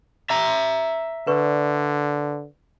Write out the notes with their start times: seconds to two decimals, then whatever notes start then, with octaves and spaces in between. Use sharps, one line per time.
0.30 E5 A#5 E6
1.27 D3 B4 D5 C#6